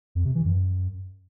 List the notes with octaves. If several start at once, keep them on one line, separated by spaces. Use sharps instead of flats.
F2
C3
E3
F#2